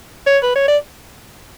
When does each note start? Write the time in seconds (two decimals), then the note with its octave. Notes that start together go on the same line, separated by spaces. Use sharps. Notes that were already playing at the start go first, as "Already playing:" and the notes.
0.26 C#5
0.43 B4
0.56 C#5
0.68 D5